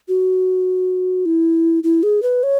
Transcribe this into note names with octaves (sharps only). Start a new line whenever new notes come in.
F#4
E4
E4
G#4
B4
C#5